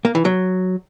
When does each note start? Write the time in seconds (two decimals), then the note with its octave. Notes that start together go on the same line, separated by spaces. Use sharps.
0.05 A#3
0.15 E3
0.25 F#3